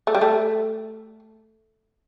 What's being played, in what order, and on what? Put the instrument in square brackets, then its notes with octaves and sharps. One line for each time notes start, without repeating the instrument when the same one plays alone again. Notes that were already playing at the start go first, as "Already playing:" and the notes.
[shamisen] A3
G3
A3